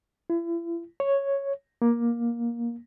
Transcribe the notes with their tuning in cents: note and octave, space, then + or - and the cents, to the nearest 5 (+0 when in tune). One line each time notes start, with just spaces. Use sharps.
E4 +40
C#5 -5
A#3 +15